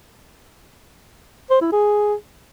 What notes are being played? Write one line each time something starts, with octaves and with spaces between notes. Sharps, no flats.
C5
E4
G#4